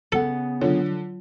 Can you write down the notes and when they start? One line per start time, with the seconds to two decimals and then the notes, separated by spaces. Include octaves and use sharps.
0.12 C#3 B3 A4 F#5
0.61 D3 F#3 F4 C#5